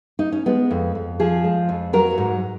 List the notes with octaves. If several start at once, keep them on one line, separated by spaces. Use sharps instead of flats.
D#4
C#4
G#3 B3
F2
F2
F3 G#4
G#3
F2
F#3 A#4
G#2